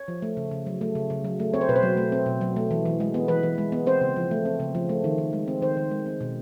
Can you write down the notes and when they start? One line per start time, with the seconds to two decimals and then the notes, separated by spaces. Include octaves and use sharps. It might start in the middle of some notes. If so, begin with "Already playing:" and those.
Already playing: C#5
0.08 F3
0.22 A3
0.37 C#3
0.51 C#3
0.66 F#3
0.81 A3
0.95 C#3
1.10 C#3
1.25 F#3
1.40 A3
1.54 C4 C#5
1.61 C5
1.69 B2 B4
1.76 C5
1.83 F#3
1.97 A3
2.12 C4
2.26 B2
2.41 F#3
2.56 A3
2.71 E3
2.86 E3
3.00 G#3
3.14 B3
3.28 E3 B4
3.43 E3
3.58 G#3
3.72 B3
3.86 C4 C5
4.01 C#3
4.16 F3
4.31 A3
4.45 C4
4.60 C#3
4.75 F3
4.89 A3
5.04 D#3
5.18 D#3
5.33 G#3
5.48 C4
5.62 D#3 C5
5.77 D#3
5.91 G#3
6.06 C4
6.20 B2